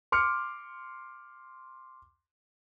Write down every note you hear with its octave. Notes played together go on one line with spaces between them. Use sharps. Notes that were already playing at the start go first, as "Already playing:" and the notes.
C6 D6 F6 C#7